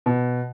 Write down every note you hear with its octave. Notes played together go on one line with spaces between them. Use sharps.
B2